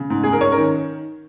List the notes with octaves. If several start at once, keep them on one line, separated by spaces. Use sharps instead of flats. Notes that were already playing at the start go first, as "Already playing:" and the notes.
Already playing: C#3
G#2
G#2 G#4
A#4
C#4 C#5
A#4
D#3